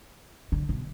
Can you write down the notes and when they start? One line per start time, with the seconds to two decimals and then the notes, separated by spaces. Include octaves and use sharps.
0.52 D3
0.69 B2